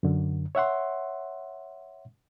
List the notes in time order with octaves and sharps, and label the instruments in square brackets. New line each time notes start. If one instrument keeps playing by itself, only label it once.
[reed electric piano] F#2 D3
C#5 E5 F#5 C6